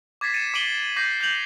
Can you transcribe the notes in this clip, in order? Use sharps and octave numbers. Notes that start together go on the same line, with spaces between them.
D6 G#6 A6 B6 C7 E7
A6 C#7 D#7 E7
D6 C7 D7 D#7 F#7 G7
E7
D6 G6 A#6 C7
G6 C7 F7 F#7